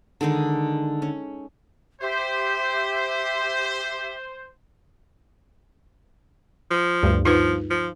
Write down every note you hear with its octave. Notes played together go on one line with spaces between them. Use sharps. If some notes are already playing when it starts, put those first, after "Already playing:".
D3 D#3 G#3 D#4
C#4
G4 C5 E5
F3
D2 G2
F3 D#4 F4 B4
F3